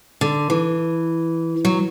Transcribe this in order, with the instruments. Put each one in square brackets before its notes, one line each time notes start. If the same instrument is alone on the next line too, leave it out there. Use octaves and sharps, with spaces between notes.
[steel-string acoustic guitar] D3
E3
F#3